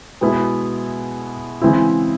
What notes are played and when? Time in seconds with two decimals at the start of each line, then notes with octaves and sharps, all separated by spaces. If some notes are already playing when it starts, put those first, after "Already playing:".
0.21 B2 G#3 B3 E4
1.62 C#3 E3 G#3 C4 E4